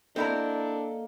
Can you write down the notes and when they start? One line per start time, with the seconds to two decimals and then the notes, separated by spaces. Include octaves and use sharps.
0.16 A#3 C4 D4 E4 A4 A#4 D#5